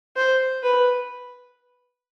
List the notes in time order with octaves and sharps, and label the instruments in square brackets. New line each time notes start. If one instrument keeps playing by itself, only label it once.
[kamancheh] C5
B4